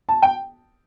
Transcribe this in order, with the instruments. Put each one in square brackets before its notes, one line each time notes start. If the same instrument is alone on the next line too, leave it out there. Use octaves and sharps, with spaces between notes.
[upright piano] A5
G5